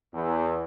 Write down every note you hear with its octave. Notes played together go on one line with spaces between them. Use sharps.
E2